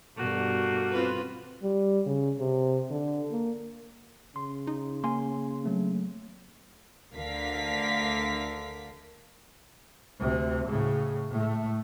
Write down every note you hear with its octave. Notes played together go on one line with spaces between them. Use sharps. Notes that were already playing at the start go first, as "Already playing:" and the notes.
G2 B2 A3 A#3 F#4
C4 F4 B4
G3
C#3
C3
D3
A#3
C#3 C6
D#4
A#3 G#5 C6
F#3 A3 C4
D2 D3 A#4 F5 B6
D2 C3
A2 C#3
A2 A3